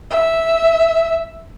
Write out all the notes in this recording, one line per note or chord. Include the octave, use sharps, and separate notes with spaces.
E5